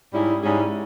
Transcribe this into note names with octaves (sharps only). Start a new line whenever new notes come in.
G#2 G3 C#4 E4 G#4
G#2 G3 C#4 E4 G#4